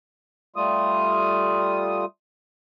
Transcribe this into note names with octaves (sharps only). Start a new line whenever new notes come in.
G3 A3 F4 D#6